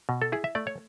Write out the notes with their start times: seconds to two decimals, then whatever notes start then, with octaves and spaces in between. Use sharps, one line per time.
0.09 B2
0.22 A4
0.32 E4 G#4
0.44 E5
0.55 A3 D5
0.67 C#5